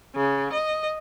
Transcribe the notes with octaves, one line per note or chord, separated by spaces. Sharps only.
C#3
D#5